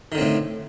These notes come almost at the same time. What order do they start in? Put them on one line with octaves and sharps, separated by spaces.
D#3 D3 C4 A2